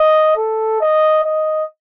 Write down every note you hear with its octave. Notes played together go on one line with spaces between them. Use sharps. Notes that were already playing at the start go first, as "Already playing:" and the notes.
Already playing: D#5
A4
D#5
D#5